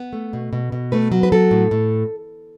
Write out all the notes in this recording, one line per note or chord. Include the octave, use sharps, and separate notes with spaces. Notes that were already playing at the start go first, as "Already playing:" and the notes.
Already playing: B3
A3
B2
B2
B2
A3 B4
F#3
B4
F#3 A4
A2
A2